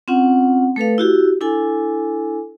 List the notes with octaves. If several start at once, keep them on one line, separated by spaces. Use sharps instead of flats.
C4 C#4 F4 F#5
A3 A4 B4 F5
E4 F#4 G4
D4 E4 A4 G#5